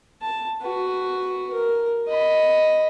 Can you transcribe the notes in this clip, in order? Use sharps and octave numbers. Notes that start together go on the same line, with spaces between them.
A5
F#4 B4
A#4
D#5 B5